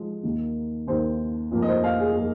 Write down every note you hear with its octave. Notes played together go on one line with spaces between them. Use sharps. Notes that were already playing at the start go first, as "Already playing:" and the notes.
Already playing: F3 G#3
D#2 D#3 A#3
D#2 D#3 A#3 C5
F1 F2 F3 A#3
D#5
C5
F5
G#4
F3 A#3 G#4